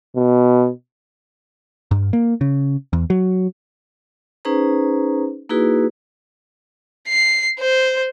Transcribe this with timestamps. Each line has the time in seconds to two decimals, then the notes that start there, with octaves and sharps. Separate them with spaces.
0.16 B2
1.91 G2
2.13 A#3
2.41 C#3
2.93 E2
3.10 F#3
4.45 C#4 D#4 G#4 B4 C5 A#5
5.49 A#3 D#4 E4 F#4 G#4 B4
7.08 C7
7.59 C5